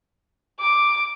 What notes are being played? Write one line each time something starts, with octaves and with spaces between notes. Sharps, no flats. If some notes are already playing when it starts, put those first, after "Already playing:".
D6